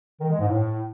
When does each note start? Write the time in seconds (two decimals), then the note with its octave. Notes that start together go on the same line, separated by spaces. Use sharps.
0.21 D#3
0.30 G#3
0.39 G#2
0.49 A2